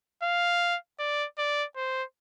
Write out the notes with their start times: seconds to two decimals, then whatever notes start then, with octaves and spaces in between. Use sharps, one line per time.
0.23 F5
0.99 D5
1.38 D5
1.76 C5